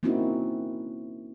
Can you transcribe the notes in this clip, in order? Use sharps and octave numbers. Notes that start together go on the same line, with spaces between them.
A#3 C4 C#4 D#4 E4 F#4